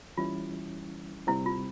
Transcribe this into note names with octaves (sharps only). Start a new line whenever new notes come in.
E3 G3 C#4 E4 F4
C3 G3 C4 E4
F4